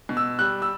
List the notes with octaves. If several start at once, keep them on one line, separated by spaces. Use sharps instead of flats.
B2
E6
G3 F#6
E6